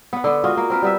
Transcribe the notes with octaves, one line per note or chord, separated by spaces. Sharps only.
B3 F#5
D3 B3
G#3 F4 F#4 D#5
A#3
C4 A#4 B4
G3 B3 E5